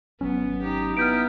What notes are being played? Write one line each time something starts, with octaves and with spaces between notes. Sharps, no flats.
G#1 F#3 B3 C#4
D#4 G4
B3 E4 B4 F6 G6 D7